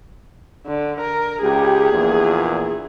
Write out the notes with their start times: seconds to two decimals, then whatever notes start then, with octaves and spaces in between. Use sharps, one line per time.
0.66 D3
1.01 A#4
1.42 C#2 G4 G#4
1.93 A#1 E2 A#2